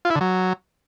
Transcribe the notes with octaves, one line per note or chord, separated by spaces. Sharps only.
F4
E4
D3
F#3